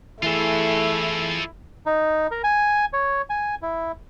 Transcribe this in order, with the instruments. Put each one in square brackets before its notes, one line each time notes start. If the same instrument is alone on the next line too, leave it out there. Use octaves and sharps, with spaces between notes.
[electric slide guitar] E3 G#4 [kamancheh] A3 [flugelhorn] E4 [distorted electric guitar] F4 A4
[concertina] D#4
A#4
G#5
C#5
G#5
E4